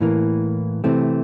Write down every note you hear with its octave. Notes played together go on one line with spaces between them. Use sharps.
A2 E3 A#3
C3 E3 A3 C4